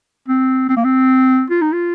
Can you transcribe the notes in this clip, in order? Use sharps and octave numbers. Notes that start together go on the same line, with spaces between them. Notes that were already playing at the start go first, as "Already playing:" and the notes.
C4
C4
A#3
C4
F4
D#4
F4